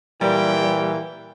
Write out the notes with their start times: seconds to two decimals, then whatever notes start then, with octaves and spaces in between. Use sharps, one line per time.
0.21 A#2 E3 G3 G5